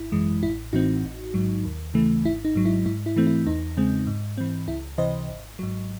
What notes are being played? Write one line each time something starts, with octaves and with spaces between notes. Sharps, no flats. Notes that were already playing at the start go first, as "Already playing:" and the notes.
Already playing: G#1 E4
F#2 E3 G#3
A1 E4
A2 E3 C4 D#4 F#4
A1
G#2 F#3
D#2
C#3 E3 A3
G#1 E4
D#4
G#2 F#3
E4
G#2 E4
E4
E3 A3 C4
E4
E2 D#4
C#3 G#3 C4
G#2
E3 C4
C#2 E4
C3 E3 C5 D#5
G#1
G#2 F#3